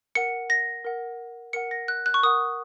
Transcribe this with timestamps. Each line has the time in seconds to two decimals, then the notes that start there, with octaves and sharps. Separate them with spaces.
0.15 A#4 F#5 C#7
0.50 A#6
0.85 A#4 F#5
1.53 A#4 F#5 C#7
1.71 A#6
1.88 F#6
2.06 F#6
2.14 C#6
2.23 A#4 F#5 D#6